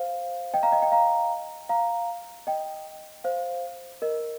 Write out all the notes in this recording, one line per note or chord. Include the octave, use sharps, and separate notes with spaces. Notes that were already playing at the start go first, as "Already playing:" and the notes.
Already playing: C5 F5
D#5 G5
F5 A#5
D#5 G5
D#5 G5
F5 A#5
F5 A#5
D#5 G5
C5 F5
A#4 D#5